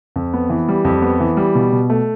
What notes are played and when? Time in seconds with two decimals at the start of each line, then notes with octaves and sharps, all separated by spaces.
0.16 F2
0.34 B3
0.50 E3
0.68 G3
0.85 F2
1.02 B3
1.20 E3
1.37 G3
1.55 B2
1.72 B2
1.90 A3